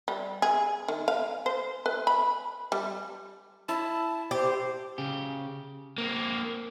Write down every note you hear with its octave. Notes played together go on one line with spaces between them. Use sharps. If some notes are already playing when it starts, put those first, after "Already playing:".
G3
G#4
D#3
F5
C5
B4
B5
G3
E4 A5
G4 C5
C#3 G4
A#3 C4